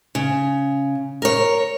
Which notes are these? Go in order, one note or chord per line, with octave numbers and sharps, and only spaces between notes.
C#3
A#4 C#5